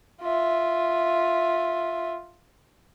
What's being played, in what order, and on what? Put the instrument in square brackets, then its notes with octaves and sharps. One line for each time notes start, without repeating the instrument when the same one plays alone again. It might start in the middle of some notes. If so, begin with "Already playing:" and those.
[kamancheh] F4 E5